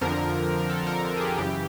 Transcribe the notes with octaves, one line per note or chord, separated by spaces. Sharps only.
F2 D3 F3 A#4
A4
A#4
G#4
G4
F#2 C#3 E3 G4